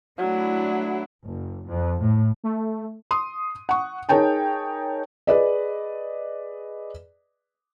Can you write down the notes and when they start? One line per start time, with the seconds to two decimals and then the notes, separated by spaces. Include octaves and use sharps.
0.18 F#3 A3 D4 E4
1.25 F#1
1.68 F2
2.01 A2
2.44 A3
3.11 C6 D#6
3.69 F#5 C#6
4.09 D#4 G#4 A#4 C#5 G5 A5
5.27 G#4 B4 D5 D#5